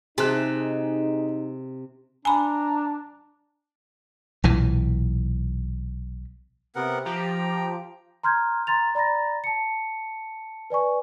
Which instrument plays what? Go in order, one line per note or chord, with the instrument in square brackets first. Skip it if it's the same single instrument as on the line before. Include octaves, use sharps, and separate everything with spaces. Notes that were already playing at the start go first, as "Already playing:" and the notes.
[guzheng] C3 A5 [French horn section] D#4 [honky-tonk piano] G#4 F#6
[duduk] D4 [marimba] G#5 B5 [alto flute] A#5
[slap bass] B1 A#2 E3
[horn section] C3 [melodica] B3 A#4 F#5
[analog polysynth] F3 G4 [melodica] G5 [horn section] A#5
[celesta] A#5 C6 F6 G6 G#6
A#5 C6 A6 F7
D5 A#5 B5 A6 A#6
A5 C#7
B4 D5 G#5 C#6